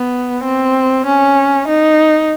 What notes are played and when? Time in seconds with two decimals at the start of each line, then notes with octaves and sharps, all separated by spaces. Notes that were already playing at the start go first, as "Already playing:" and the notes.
Already playing: B3
0.44 C4
1.06 C#4
1.68 D#4